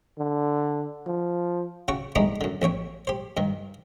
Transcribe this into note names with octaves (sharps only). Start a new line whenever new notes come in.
D3
F3
C#3 F#4 G5 C#6
G#3 A3 B3 D4 D#4 G4
F#2 D3
A1 E2 C#5 G5
G4 C5
G2 D#3